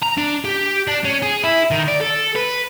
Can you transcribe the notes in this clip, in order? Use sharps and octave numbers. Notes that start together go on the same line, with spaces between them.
A#5
D4
G4
D4
C#4
G#4
E4
D#3
D5
A4
B4